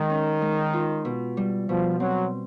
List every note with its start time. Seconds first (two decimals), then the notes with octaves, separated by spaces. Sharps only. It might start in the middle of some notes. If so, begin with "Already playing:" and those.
Already playing: D#3 G#3
0.10 C#4
0.42 G#3
0.73 F4
1.05 B2
1.37 G3
1.69 B2 F3
2.00 F#3 C4